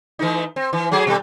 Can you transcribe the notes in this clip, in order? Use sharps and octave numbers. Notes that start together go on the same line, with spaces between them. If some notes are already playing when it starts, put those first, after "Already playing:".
E3 A3 D#4
C4
E3
F#3 A3 G#4
B2 G3 A4